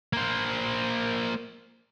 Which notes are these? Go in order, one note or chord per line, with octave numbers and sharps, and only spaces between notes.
A#3 C5